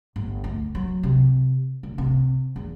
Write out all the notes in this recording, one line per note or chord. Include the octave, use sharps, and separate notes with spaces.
G1
D2
F#3
C3
D3
C3
E2